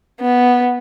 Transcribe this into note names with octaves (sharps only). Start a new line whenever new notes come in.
B3